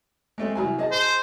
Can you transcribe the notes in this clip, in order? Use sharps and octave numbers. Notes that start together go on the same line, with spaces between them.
G#3 A3 C4
C2 F#3 G#5
G#4 D#5 A5
C5